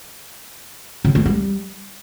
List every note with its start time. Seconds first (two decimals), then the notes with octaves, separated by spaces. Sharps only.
1.05 C#3
1.15 A3
1.26 G3